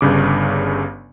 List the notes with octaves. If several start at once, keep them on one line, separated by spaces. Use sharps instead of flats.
G1 G2 C#3 D6